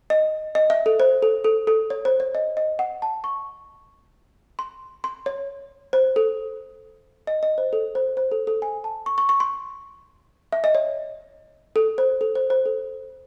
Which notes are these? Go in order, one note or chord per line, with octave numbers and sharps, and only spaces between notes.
D#5
D#5
E5
A4
C5
A4
A4
A4
C#5
C5
C#5
D#5
D#5
F#5
A5
C#6
C6
C6
C#5
C5
A4
D#5
D#5
C5
A4
C5
C5
A4
A4
G#5
A5
C#6
C#6
C#6
C6
E5
D#5
C#5
A4
C5
A4
C5
C5
A4